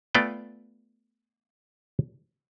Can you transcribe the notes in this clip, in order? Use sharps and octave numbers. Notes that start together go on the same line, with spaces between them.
A3 B3 F4 D5 G5